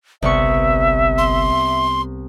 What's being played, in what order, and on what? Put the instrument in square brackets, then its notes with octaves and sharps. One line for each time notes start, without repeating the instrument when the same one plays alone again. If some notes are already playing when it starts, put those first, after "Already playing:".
[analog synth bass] G1 [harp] C2 B3 C#6 [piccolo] E5
[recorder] C6